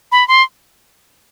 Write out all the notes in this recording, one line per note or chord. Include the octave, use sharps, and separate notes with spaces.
B5
C6